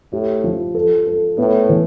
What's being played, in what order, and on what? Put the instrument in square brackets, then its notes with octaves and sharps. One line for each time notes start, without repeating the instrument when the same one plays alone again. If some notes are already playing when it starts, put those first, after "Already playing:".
[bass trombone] A2 [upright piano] G4
[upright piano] F3
A4
A4
[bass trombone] A2 [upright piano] B3
[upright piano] E3